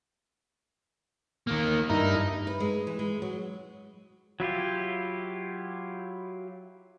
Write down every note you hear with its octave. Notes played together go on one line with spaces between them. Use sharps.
D#3 A#3
G2 D#4 E4 A#4
B4
G#3
E3
G#3
F#3
F#3 E4 F4 G4